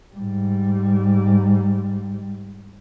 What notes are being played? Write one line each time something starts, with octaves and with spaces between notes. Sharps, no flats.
G#2 G3